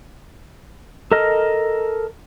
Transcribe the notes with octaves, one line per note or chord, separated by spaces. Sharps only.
A4 A#4 D#5 F6